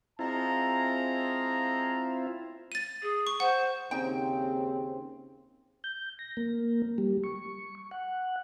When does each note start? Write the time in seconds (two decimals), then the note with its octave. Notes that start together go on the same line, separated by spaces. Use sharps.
0.19 G#3 C4 E4 F4 A5 A#5
2.72 A6 D#7
3.03 G#4
3.27 C#6
3.40 C5 F#5
3.91 D#2 C#3 C4 D#4 G5
5.84 G6
6.19 A#6
6.37 A#3
6.98 G3
7.24 C#6
7.91 F#5